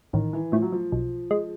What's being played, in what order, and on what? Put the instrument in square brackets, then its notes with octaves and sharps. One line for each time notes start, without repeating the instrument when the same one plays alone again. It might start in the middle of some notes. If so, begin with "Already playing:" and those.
[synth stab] A1 [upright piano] D#3
[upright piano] E3
[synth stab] A2 [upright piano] F3
[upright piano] F#3
F3
[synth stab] B1
G#3